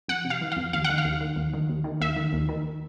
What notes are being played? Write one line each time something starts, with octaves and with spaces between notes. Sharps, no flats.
F2 F#5
C3
F5
E3
F2 F5
D#2 F5
D#3 F#5
F5
D#2
D#3
D#2
D#3
D#2
D#3
D#2 E5
D#3
D#2
D#3